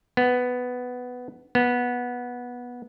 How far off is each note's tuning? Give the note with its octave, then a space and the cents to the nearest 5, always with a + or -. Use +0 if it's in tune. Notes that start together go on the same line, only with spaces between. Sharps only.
B3 +5
B3 -15